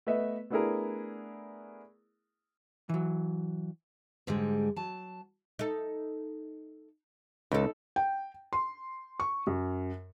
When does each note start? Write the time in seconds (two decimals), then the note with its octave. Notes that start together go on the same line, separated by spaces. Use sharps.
0.07 A3 B3 B4 D#5 E5
0.50 A3 B3 D4 E4 G#4 A#4
2.89 E3 F#3
4.27 G#2 D3 G3 G#3
4.76 F#3 A5
5.59 D#4 A4
7.52 C#2 D#4 A4
7.96 G5
8.53 C6
9.20 C#6
9.47 F#2